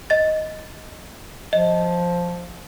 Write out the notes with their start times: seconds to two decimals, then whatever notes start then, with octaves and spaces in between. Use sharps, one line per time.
0.10 D#5 A6
1.53 F3 D#5